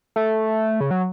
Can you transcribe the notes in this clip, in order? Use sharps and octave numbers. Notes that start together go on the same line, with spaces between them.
A3
C#3
F#3